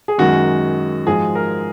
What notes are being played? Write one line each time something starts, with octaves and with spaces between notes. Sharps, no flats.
G#4
F#2 D#3 G#3 F#4
G#2 F3 G#3 G#4
A#4